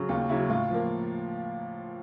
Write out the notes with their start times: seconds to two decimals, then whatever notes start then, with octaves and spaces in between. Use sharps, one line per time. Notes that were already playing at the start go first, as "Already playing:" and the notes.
Already playing: C#3 F#3
0.09 D#2 F4
0.29 C#3 F#3 E4
0.49 A2 F4
0.70 F3 A#3